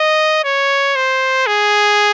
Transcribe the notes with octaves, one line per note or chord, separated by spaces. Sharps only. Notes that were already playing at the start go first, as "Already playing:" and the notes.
Already playing: D#5
C#5
C5
G#4